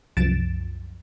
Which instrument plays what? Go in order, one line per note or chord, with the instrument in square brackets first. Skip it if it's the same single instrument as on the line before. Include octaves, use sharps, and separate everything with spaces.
[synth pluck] C2 F#2 F3 A6 D7 E7